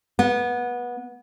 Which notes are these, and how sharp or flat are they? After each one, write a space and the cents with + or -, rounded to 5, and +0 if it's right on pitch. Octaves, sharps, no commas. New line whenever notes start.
B3 -20